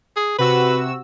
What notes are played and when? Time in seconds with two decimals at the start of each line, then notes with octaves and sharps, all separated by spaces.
0.17 G#4
0.39 C3 F#4 B4 E6